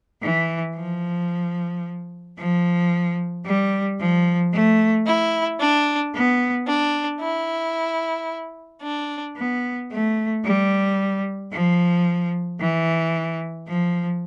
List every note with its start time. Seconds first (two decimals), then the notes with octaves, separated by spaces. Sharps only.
0.21 E3
0.75 F3
2.36 F3
3.44 G3
3.98 F3
4.51 A3
5.06 E4
5.59 D4
6.13 B3
6.67 D4
7.20 E4
8.82 D4
9.36 B3
9.90 A3
10.43 G3
11.51 F3
12.59 E3
13.67 F3